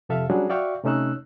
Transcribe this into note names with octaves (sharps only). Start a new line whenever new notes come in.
F2 C3 G4 A4 E5 F5
F#3 G3 C#4 D4 F#4 G#4
F#4 D5 E5 F5 G5 C#6
C3 A3 C#4 D#4 E6 F#6